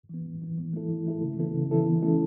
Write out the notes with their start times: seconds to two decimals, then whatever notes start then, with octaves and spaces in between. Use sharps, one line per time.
0.09 E3 B3
0.26 A2
0.41 E3 B3
0.58 E3
0.73 A3 E4 A4
0.90 E3
1.06 A3 E4 A4
1.22 C#3
1.38 E3 B3 E4 A4
1.55 C#3
1.71 E3 B3 E4 A4
1.87 E3
2.02 A3 C#4 E4 A4